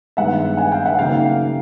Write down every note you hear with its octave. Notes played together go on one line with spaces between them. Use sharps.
G2 D#3 G#3 B3 E5 F#5
F#5 G#5
F5 G5
E5 F#5
C#3 F#3 A#3 D#4 F5 G5